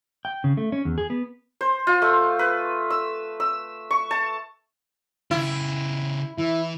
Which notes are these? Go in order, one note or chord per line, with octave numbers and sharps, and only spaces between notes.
G5
C#3
A3
C#4
E2
G#4
B3
C5
F4
A3
B4
E6
E6
C#6
A5
C#3 E4 G4
E3 E4